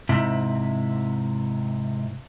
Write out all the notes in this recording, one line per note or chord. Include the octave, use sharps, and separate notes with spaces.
G#2 C3 E4